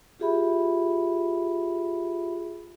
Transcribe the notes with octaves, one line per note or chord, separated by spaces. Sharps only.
F4 G4 G#4 E5 B5